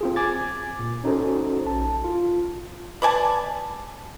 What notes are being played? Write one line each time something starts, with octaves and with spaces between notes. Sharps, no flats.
C4 F4 G#4
G#5 D6 G#6 A6
A#2
C#4 D#4 F#4 A4 C5
A#1 A5
F4
B4 D5 G#5 A5